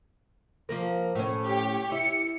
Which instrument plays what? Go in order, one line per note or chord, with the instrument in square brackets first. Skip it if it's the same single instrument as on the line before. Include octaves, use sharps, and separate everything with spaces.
[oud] F3 A#3 A#4
A2 C#4
[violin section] G4 C#5
[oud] E4 [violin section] C#7